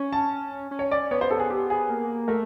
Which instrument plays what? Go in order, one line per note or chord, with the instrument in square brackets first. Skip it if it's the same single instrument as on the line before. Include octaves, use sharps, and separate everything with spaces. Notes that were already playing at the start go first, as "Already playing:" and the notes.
Already playing: [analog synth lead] C#4
[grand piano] A5
[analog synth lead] C#4
[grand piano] C#5
D5
[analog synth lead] B3 [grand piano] C#5
[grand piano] C5
A4
G#4
G4
G#4
[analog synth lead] A#3
[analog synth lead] A3 [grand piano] A#4